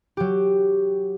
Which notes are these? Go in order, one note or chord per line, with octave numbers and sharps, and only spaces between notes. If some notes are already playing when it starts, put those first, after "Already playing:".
F#3 G4